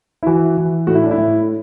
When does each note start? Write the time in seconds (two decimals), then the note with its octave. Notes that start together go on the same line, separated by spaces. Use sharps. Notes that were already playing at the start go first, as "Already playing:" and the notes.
0.23 E4
0.26 E3 F#4
0.58 E3
0.87 A2 F#4
0.95 E4
1.03 D4
1.11 E4
1.18 A2